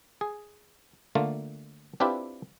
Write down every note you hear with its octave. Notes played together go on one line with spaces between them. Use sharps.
G#4
D3 A3 A#3 F4
C4 D4 E4 F4 G4 B4